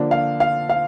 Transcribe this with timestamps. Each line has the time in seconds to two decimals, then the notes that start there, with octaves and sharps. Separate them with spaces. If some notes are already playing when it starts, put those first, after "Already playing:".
Already playing: D3 F3 A#3 D4
0.11 F5
0.40 F5
0.70 F5